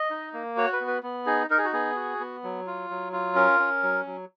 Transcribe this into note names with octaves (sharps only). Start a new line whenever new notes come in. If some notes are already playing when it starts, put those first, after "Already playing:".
Already playing: D#5
D#4
A#3
F#4 C#5
B4
B3
B4
B3
D#4 G#4
D#4 A#4
G#4
F#4
B3 G#4
F#4
B3
F#3
F4
F#3
F4
C#4 A#4
C#4
F#3
F#3